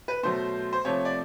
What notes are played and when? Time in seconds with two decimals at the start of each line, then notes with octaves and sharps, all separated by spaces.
0.08 B4
0.23 B2 F#3 A3 C5
0.73 C5
0.85 C3 F3 A3 C#5
1.05 D5